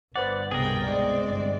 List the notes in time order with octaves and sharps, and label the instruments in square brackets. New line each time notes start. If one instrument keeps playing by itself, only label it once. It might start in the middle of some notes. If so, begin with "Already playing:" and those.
[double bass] G1 [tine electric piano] B4 C5 F#5 [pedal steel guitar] D5
[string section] C2 B2 G5 [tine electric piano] B3 [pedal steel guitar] G#4 A#4
[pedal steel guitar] G#3 [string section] C4 D5
[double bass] G1